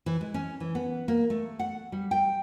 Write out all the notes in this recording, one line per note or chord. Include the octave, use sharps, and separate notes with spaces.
E3
G#3
C#4
E3
B3
A#3
A3
F#5
G3
G5